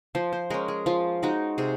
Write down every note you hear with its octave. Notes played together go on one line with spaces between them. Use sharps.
F3 C5
C5
G#3 C#4 A#4
G#4
F3 F4
G#3 D#4 F#4
C3 G#4